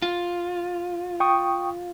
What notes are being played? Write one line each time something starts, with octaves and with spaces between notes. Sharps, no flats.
F4
G5 C#6 D#6